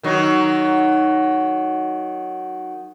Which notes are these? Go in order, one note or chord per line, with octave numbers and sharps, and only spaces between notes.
D#3 F#3 D#4